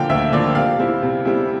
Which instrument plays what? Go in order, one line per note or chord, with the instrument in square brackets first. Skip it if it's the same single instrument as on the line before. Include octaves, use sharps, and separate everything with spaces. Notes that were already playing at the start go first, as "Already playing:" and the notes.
Already playing: [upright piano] D3 F3 A#3 F5 G5
D2 E5
D3 F3 A#3 D5
C3 F5
G3 C4 E4
C3
G3 C4 E4